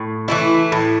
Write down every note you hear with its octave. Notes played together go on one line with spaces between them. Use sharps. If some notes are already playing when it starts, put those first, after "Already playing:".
Already playing: A2
E3 A3 E4
A2